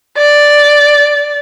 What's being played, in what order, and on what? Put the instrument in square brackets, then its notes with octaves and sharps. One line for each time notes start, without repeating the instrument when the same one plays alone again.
[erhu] D5